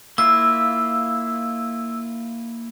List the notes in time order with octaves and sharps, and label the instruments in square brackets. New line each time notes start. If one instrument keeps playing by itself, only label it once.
[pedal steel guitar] A#3 E4 F4 [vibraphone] E6